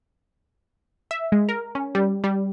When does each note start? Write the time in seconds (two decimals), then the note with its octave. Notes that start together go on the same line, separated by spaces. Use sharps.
1.11 E5
1.32 G#3
1.49 A#4
1.75 C#4
1.95 G3
2.24 G3